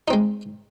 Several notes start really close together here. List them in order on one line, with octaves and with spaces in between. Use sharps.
D#4 C4 G#3